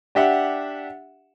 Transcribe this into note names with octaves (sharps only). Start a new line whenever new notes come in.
D4 G4 E5 F#5